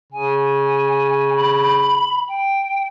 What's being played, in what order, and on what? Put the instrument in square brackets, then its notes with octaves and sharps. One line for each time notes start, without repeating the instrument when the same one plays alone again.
[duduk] C#3 [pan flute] G#5
[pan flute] B5
G5